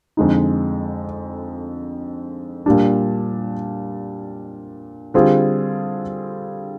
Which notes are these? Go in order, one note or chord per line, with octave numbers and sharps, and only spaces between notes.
F2 D3 G#3 D#4
A#2 G3 D4
D3 G3 C4 F4 G#4